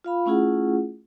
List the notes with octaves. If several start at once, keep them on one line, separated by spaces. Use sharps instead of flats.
F4 F5 B5
A3 C#4 E4 F4 G#4 F#5